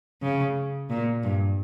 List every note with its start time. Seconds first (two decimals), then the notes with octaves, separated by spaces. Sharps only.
0.22 C#3
0.90 A#2
1.23 G2